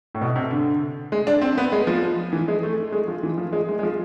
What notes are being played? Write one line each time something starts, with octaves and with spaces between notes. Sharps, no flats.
A2
B2
C3
D3
G#3
D4
C4
B3
G#3
F3
E3
G#3
A3
G#3
F3
E3
F3
G#3
G#3
G#3
F3